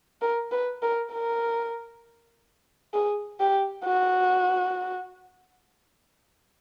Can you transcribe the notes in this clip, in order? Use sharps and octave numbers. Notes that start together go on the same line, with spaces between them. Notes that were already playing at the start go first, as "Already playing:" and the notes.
A#4
B4
A#4
A#4
G#4
G4
F#4